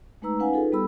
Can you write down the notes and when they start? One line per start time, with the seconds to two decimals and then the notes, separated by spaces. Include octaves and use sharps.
0.22 G#3 A3 D#4 B4 A#5 E6
0.39 C#4 D#4 B4 F5 F#5 G#5
0.53 D#4 F4 G#4 A4 B4
0.72 G3 B3 G4 A4 B5 E6